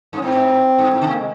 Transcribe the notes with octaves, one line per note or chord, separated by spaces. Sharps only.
G2
C#4
G#2 C4
G2
G#2
C#3
C3 A#3
G#3